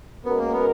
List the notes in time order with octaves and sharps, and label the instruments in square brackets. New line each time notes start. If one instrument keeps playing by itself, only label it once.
[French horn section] B2 G#3 C#4 F#4 A#4 [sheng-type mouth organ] B3
[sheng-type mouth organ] A#3
B3